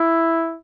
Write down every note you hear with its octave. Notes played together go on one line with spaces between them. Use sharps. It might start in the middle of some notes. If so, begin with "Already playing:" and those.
Already playing: E4